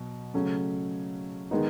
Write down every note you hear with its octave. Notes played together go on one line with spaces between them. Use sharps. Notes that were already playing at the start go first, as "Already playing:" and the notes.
Already playing: B2 F#3
C#3 F#3 A3 C#4
D#3 G#3 B3 D#4